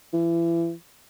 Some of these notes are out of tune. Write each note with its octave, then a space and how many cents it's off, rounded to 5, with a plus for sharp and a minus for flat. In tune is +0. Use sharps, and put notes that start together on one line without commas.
E3 +30